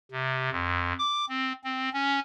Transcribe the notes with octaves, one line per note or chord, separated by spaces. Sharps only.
C3
F2
D6
C4
C4
C#4